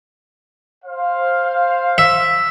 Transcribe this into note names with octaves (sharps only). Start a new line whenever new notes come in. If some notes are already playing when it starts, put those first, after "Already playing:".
C5 F5
E5